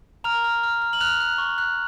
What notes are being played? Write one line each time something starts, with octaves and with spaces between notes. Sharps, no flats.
A#5 F6 F7
F6
F6
F6
F#7
F6 F#6 F7
F#6
C#6
F#6